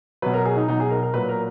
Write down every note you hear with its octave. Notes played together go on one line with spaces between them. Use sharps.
B2 F#3 B4
A#4
G#4
D#4
B2 F#3 D#4
G#4
A#4
A#4
A#2 F#3 B4
A#4